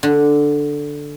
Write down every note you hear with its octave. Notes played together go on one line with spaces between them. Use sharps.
D3